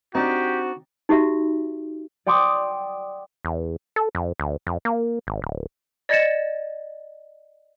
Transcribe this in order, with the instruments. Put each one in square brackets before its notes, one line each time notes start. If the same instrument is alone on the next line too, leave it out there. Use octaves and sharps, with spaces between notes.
[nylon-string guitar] C4 [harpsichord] D4 D#4 [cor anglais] F#4 [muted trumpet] G4
[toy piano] D#4 F#4 G4 E5
[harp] D5 F#5 G5 C6 D6 D#6
[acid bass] E2
A4
F2
D2
F2
A#3
G#1
D1
[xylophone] D5 D#5 G#6 A6 C#7 E7